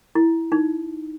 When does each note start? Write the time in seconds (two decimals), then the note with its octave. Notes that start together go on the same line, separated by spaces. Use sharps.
0.15 E4
0.52 D#4